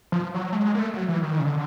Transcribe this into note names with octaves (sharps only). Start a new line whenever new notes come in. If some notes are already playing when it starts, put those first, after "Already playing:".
F3
F#3
A3
G#3
A#3
A3
F#3
E3
D#3
C#3
D3